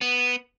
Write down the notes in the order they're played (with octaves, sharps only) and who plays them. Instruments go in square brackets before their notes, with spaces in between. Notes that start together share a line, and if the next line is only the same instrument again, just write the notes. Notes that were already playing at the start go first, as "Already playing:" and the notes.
[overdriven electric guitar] B3